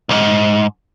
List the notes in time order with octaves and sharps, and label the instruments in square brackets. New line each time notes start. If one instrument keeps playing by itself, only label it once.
[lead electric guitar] B1 G#2